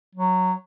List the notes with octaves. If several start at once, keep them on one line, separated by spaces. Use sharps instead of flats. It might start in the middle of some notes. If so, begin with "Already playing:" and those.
F#3